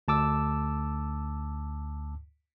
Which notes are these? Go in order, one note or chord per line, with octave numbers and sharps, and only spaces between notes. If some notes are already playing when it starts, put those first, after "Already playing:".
D2 A5 D6 E6